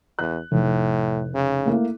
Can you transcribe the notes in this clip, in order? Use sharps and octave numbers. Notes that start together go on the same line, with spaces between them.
E2 F#6
F1 A2
C#3
A3 A#3 E4